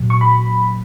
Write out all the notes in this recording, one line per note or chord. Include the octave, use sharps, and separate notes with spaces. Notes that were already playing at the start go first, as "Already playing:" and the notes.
Already playing: A#2 F#3
C#6
B5